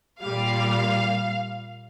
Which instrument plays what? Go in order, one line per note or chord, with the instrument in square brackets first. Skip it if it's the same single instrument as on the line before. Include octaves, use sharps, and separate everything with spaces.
[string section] A#2 G3 F5